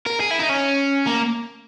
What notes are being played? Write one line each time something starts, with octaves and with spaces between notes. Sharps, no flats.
A#4
G#4
E4
D#4
C#4
A#3